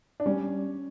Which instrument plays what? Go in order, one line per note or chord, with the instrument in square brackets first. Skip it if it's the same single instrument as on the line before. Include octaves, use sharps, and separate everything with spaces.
[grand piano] D4
[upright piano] G3 [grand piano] C#4